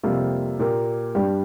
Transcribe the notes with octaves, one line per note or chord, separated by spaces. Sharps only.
F2 C3 G3 A#3 F4
A#2 A#3 G4 A#4
G2 G3 D4 G4